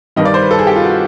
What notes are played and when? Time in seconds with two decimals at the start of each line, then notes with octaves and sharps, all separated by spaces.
0.16 G2 D#3 G3 D#5
0.25 D5
0.34 C5
0.42 B4
0.51 A4
0.59 G#4
0.67 G4
0.76 F4
0.84 F#4